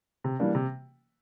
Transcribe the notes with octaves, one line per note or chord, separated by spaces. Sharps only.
C3
E3 G3 A#3 D4
C3